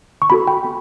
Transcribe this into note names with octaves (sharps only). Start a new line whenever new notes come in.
C#6
B3 F#4 A4 B5
G5
B3